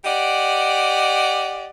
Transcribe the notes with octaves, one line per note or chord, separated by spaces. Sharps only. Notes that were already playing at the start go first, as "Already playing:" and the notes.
G4 D5 D#5 F#5